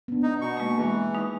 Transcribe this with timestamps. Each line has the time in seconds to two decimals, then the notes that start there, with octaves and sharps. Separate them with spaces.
0.08 B3 D4
0.23 D#4
0.41 B2 C#6
0.57 G#3 A#3
0.78 E3 G#4
1.14 G#3 D#4